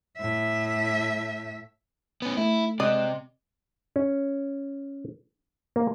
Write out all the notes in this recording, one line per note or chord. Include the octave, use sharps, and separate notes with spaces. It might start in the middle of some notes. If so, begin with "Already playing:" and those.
A2 E5
B3 C#4
A3 E4
C3 G#3 D5 D#5 F#6 E7
C#4
A#3